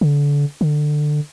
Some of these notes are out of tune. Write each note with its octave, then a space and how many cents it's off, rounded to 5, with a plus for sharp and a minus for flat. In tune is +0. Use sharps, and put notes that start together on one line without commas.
D3 -30
D3 +20